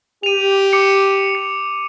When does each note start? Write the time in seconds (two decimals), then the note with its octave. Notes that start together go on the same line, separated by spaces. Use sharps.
0.23 G4 D#7 F7
0.73 D6 C#7
1.35 C#7